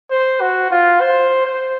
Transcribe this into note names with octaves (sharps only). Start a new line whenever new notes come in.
C5
F#4
F4
C5
C5